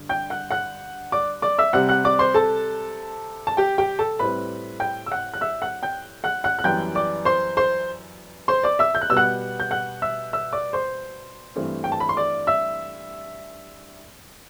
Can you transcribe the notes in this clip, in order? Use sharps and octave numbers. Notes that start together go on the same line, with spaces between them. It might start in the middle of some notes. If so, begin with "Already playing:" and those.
Already playing: G2 D3
G5 G6
F#5 F#6
F#5 F#6
D5 D6
D5 D6
E5 E6
C3 G3 C4 F#5 F#6
F#5 F#6
D5 D6
C5 C6
A4 A5
A5
G4 G5
G4 G5
A4 A5
A2 G3 C4 B4 B5
G5 G6
E6
F#5 F#6
F#6
E5 E6
F#5 F#6
G5 G6
F#5 F#6
F#5 F#6
F#6
F#2 E3 G3 B3 G5 G6
D5 D6
C5 C6
C5 C6
C5 C6
D5 D6
E5 E6
G6
F#6
B2 G3 B3 E6
F#5 F#6
G6
F#5 F#6
E5 E6
E5 E6
D5 D6
C5 C6
G2 E3 A3 C4
G5
A5
B5
C6
D5 D6
E5 E6